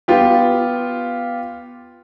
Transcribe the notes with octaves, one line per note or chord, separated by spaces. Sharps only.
B3 F4 G4